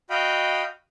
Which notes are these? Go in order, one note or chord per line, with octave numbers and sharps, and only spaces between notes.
F#4 D#5 F5 G5 B5